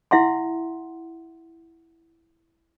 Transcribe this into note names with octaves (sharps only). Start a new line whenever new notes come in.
E4 E5 F#5 C6